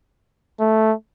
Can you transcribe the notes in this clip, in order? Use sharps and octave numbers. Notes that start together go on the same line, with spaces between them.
A3